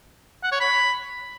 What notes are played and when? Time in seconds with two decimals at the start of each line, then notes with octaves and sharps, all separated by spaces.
0.44 F#5
0.52 C#5
0.61 B5